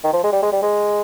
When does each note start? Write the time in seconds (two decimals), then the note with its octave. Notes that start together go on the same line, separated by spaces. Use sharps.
0.04 D#3
0.13 F3
0.24 G#3
0.33 G3
0.43 G#3
0.52 G3
0.62 G#3